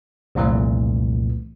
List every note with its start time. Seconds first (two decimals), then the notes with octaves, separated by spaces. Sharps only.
0.35 C2 F2 A#2 E3 A3